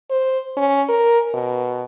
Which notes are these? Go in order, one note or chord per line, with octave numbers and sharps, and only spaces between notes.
C5
C#4
A#4
B2